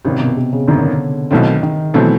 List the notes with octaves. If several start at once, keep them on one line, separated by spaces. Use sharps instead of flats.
G#1 F#2 C3 D#3
B2
C3
C#3
G#1 F#2 D3 D#3
B1 B2 D#3 F#3 A3 C4
D#3
B2 E3 F#3 A3 C4